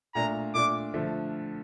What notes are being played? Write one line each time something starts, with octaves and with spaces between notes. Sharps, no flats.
A#2 A3 D4 A#5
A#2 A3 D4 D6
D3 F3 A3